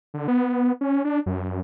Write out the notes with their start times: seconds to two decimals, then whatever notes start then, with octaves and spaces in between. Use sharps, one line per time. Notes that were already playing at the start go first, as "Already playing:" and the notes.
0.14 D3
0.28 B3
0.81 C#4
1.05 D4
1.26 F#2